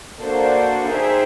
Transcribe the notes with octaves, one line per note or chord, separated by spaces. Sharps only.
A#3 D4 F#4 A4 C5
D#4 G#4 C5 E5 G5